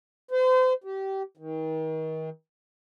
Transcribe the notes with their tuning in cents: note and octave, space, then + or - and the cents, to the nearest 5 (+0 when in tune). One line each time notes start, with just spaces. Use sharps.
C5 -35
G4 -25
D#3 +35